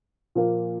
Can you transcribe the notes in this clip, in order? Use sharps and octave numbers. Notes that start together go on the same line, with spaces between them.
A#2 F3 A#3